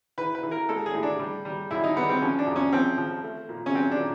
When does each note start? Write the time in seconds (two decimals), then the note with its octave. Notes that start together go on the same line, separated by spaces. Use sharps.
0.18 E3 B4
0.35 B4
0.43 E3
0.51 A#4
0.69 G#3 A4
0.86 G#4
0.94 A2
1.03 D4
1.19 G3
1.45 G3
1.71 F#2 E4
1.84 D#4
1.96 G3 B3
2.09 C4
2.22 F3 C#4
2.39 D4
2.47 F2
2.56 C#4
2.72 F3 C4
2.98 F3
3.23 A3
3.49 A#2
3.66 C#4
3.74 F#3 C4
3.91 D4
4.00 A#2